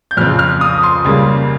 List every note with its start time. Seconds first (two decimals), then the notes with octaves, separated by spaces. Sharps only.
0.11 G6
0.17 F2 C#3 F3 C4 F6
0.39 F6
0.61 D#6
0.83 C6
1.05 C#2 C#3 G3 A#3